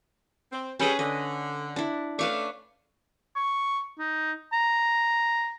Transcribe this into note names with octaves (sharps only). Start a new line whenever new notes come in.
C4
G3 C#4 G#4 A4 B4
D3 D#5
D4 E4
A3 C#4 D4 B4 F5 C#6
C#6
D#4
A#5